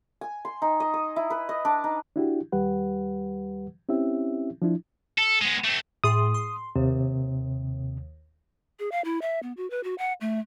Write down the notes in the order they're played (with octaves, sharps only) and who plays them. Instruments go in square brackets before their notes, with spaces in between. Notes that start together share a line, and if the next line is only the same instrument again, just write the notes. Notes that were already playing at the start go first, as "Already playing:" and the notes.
[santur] G#5
C6
D#4
D#5
D#6
E4
B4
D#5
D4
D#4
[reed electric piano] D4 E4 F#4 G4
D#2 G3 G4 B4 F#5
C4 C#4 E4 G4 E5
F3 D4 E4
[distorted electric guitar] A4
G#3 B3
A3 C4
[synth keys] A2 G#4 C6 [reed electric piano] D#6
[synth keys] C6
[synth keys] D#2 [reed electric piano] C3
[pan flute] G#4
F5
E4
E5
B3
F#4
B4
F#4
F#5
A3